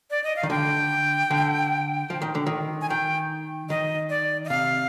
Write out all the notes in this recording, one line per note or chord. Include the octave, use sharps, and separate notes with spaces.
D5
D#5
F5
D#3
D3 G5
D3
F3
D#3
D3
D#3
G#5
D#3 G5
D#3 D#5
D5
D#5
C3 F5